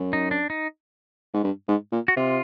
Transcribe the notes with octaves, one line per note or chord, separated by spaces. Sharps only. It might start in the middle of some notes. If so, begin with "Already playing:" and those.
Already playing: F#2
D#4
D4
D#4
G#2
G2
G#2
A#2
F#4
C3 F4